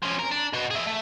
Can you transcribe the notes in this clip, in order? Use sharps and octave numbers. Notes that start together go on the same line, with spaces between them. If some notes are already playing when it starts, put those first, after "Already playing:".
F3 C#4
A#4
D4
B2 F#4
G#4 E5
A3